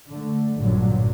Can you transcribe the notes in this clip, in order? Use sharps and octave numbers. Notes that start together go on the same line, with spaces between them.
D3 A3
A1 G2 A#2 D3 F#3